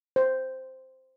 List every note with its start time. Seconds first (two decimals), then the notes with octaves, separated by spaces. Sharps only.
0.16 C5